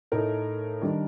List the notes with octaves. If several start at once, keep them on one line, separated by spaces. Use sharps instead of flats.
A2 A3 D#4 A#4
D#3 G3 D4